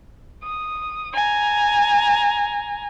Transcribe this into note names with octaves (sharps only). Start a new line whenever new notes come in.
D#6
G#5 A#5